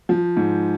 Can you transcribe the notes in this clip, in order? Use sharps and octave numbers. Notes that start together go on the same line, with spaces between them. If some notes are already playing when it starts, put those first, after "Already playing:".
F3
G#2